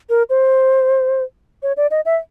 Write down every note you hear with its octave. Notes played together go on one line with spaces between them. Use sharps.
A#4
C5
C#5
D5
D#5
E5